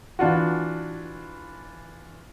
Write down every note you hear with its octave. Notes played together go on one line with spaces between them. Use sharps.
E3 D4 F4 F#4